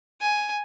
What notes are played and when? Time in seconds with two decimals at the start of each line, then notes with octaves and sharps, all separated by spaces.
0.21 G#5